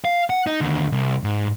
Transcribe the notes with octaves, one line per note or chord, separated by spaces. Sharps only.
F5
F#5
D#4
D#2 D3
C2
G#2